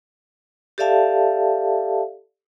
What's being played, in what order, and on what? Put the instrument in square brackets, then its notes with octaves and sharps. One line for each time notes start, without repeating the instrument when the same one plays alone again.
[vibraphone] G4 A4 D5 E5 F5 A5